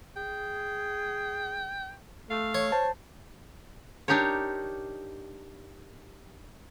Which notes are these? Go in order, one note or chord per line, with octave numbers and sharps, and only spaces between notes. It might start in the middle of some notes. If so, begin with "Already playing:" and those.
G#4 G5
A3 F5
C#5
C5 A5
D4 D#4 G4 A#4 C#5